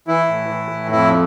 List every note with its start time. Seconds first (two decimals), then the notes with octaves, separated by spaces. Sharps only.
0.08 E3 E4
0.29 A2
0.49 E3
0.71 A2
0.91 F2 E4